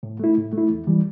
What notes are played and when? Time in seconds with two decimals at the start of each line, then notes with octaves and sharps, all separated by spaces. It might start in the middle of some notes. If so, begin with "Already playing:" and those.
0.03 A2
0.20 A3 E4
0.37 A2
0.53 A3 E4
0.69 E2
0.87 E3 G3